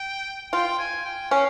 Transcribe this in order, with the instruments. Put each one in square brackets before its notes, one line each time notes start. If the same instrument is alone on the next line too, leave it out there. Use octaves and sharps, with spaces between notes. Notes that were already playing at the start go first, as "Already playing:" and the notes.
Already playing: [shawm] G5
[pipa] F4 [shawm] G5
[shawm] G#5
G5
[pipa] C#4 [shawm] F5